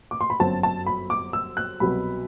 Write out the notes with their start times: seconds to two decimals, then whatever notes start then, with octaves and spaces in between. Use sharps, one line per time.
0.11 D6
0.21 C6
0.30 B5
0.40 G1 F#2 F#3 C4 A5
0.63 A5
0.86 B5
1.10 D6
1.33 E6
1.57 F#6
1.80 C2 B2 F#3 B5